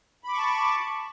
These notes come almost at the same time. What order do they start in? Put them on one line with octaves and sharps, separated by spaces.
B5 D6 C#6 A5